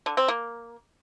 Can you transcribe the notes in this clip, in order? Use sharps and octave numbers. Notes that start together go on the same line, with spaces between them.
D3
C4
A#3